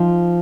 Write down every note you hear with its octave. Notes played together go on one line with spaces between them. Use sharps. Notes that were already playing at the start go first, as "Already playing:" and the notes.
Already playing: F3 D#4